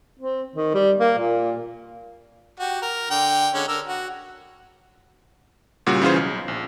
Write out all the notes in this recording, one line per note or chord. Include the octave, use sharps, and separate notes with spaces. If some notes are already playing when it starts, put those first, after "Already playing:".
C4
D#3
G3
A#3
A#2
F#4 G4
A#4
D3 G5
D3 G#3 C#4
D3 A#4 E6
F#4
A#2 C#3 G3 F#4
C#3 E3 C#4 F4 G#4 C5
B1
A#1